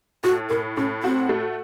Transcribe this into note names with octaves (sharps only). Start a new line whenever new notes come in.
A2 F#4
A2 A#4
A2 C#4
C4 F#4
A3